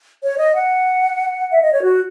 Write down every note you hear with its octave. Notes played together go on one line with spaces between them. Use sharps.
C#5
D#5
F#5
E5
D#5
C#5
F#4